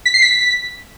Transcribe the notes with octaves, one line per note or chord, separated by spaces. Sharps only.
B6
C7
B6